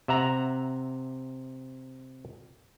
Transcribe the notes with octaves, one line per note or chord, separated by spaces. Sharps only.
C3 E5 F#5 A#5